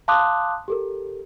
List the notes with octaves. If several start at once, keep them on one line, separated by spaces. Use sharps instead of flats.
F5 A5 C6 D6 D#6 F#6
G4 A4 A#4